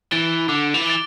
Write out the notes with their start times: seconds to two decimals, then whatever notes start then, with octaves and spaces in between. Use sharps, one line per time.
0.12 E3 A6 D7 G7
0.49 D3 D6
0.74 E3
0.86 A6 D7 G7